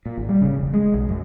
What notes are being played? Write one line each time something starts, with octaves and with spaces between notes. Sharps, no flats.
A#2
G#1
G3
C#3
E1
G#3
B1
F#2